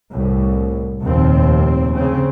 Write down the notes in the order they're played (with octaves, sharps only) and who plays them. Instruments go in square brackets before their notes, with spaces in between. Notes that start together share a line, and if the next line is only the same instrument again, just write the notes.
[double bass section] C2 A2
F1 D#2 A#2 C4
C#3 C4